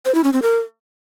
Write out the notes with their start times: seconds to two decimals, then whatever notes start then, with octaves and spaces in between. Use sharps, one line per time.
0.06 C5
0.15 E4
0.24 C#4
0.33 C4
0.42 A#4